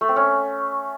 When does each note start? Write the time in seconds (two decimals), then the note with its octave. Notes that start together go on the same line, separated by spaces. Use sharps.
0.01 A3
0.09 C4
0.16 C#4